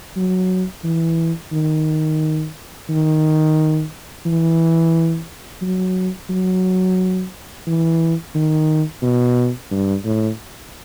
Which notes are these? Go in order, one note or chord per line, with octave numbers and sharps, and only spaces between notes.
F#3
E3
D#3
D#3
E3
F#3
F#3
E3
D#3
B2
G2
A2